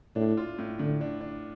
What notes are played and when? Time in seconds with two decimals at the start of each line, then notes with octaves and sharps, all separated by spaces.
0.16 A2 D4
0.37 F4
0.58 A2
0.79 A2 D3
1.01 D4
1.21 D4